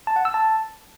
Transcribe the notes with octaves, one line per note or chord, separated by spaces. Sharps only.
A5
F#5
E6
A5